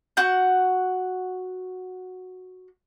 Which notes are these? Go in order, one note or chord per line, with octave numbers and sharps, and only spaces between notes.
F#4 F#5 G6